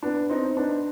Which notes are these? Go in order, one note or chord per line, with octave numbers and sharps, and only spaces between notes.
B3 D4
C4 D#4
B3 D4